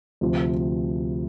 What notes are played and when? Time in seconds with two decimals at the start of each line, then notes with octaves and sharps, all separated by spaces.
0.21 D2 C3 F3